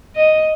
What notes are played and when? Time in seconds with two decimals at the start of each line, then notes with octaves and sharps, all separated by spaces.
0.16 D#5